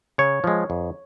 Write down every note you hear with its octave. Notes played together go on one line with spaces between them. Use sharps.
C#3 C#5
F3 G#3
F2